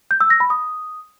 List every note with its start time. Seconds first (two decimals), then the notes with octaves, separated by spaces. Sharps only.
0.11 G6
0.21 E6
0.30 A#6
0.40 B5
0.50 D#6